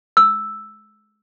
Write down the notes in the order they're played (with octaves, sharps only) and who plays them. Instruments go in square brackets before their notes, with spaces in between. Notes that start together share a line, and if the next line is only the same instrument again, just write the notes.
[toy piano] E6